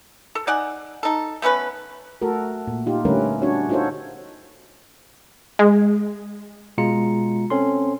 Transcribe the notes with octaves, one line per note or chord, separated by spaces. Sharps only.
A4
D#4 D5 F#5 G#5
D#4 A4
A3 B3 C#4 B4
A3 F#4 A4 A#4
A#2
D#4 F4 G4
D3 G3 A3 C#4 A#4 B4
C#4 D4 F#4 C#5
D#4 F4 F#4 A4 C5 C#5
G#3
B2 G#3 F4 A#5 C#7
C4 C#4 A4 C6